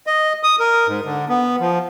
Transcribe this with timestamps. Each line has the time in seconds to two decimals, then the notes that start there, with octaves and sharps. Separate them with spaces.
0.07 D#5
0.43 D#6
0.59 A#4
0.87 G#2
1.05 D3
1.29 B3
1.60 F3